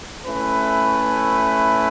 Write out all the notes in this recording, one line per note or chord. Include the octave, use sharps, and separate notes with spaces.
A3 C#4 E4 B4